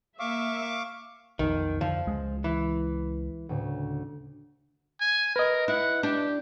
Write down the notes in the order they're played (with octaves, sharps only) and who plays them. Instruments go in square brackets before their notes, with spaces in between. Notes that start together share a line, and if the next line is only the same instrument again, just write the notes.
[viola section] A#3 E5 [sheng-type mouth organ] F5 C#6 D6
[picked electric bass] B1 F2 [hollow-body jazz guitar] D#3
[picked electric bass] F2 D3 [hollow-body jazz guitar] F3
[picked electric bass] C#2 G#3
[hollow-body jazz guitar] E3
[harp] D2 A2 C#3
[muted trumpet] G#5
[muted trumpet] A#4 [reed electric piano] B4 D#5
[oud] E4 [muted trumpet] F#5
[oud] D4 [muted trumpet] G4